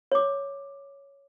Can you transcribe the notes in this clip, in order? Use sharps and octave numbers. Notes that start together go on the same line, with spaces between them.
C#5 D6